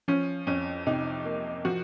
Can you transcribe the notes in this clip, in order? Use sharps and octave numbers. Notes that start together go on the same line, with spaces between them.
F3 C#4
F2 C#4
C3 D#4
A#3
F3 F#4